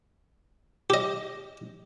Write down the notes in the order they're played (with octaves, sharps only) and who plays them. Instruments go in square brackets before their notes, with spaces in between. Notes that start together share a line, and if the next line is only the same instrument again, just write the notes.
[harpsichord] G4 D#5